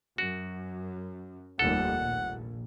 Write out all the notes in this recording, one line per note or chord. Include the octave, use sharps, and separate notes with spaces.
F#2 F#4
F1 D#2 G3 A4 F#5
A#1